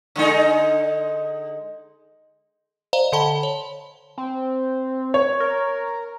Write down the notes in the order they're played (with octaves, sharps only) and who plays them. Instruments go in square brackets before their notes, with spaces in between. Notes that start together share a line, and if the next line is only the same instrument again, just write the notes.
[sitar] D3 G#3 D#4
[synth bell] C5 D5 D#5 F5 A#5
D3 A4 A5 B5 G7
C#5
[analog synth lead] C4
[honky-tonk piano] C#5
[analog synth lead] A#4